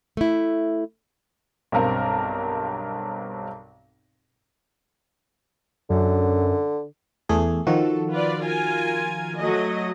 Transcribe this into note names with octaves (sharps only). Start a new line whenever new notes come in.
A3 E4
B1 G2 C4 A#4 F5
F#2 D3
E2 A3 G#4
D#3 F3 F#4 A4
F4 B4 D5
F4 A#4 G#5
F#3 A3 D#5